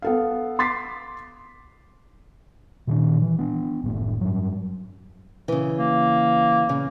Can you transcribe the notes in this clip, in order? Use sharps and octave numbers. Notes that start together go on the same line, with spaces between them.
B3 A4 F5
C6 D6 A6 B6 C7
A#2 D#3 D4
E3
B3 D4
F#1 A2 A3
G2 F#3
C#3 E3
A#3
C#3